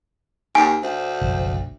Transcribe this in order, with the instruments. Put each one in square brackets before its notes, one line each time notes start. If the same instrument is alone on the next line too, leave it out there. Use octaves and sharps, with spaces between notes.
[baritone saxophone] D#2 [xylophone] G#5
[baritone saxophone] D2 [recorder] C5
[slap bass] F#1 B1 F3